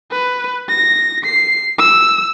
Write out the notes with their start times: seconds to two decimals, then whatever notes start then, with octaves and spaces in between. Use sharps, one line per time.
0.11 B4
0.69 A#6
1.25 C7
1.78 E6